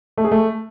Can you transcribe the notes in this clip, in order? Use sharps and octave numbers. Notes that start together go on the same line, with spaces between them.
A3
G#4
A3